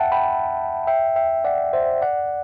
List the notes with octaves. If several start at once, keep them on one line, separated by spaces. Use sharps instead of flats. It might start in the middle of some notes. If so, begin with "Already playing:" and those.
Already playing: E5 F#5 G5 A5
G5 B5
E5 G5
E5 G5
D5 F#5
C5 E5
D5 F#5